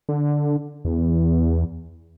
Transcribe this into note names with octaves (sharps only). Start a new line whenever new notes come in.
D3
E2